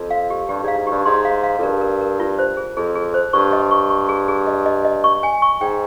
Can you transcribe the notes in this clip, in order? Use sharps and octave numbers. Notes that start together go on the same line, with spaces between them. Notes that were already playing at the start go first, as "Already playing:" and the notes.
Already playing: F2
F5
G4
G2 G4
G#2 F5
G#2
G2 G4
G#2 C6
F5
F5
F2
G2 A#4
A#4
A#4
F4
C5
G#4
F2 G#4
G#4
C5
G2 C#6
D#5
C#6
C#6
G#4
G#4
D#5
D#5
D#5
C#6
G#5
C#6
G#2 G5